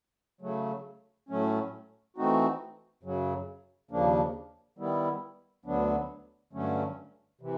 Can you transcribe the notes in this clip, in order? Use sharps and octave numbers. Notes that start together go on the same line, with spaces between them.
C#3 F#3 A3
A2 F#3 A3 C#4
E3 A3 C4 D#4 F#4
F#2 C#3 F#3
D#2 C#3 F3 A#3 D4
D#3 G3 B3 E4
D2 D3 F#3 B3 D4
G2 D3 F#3 A3 C#4
C3 E3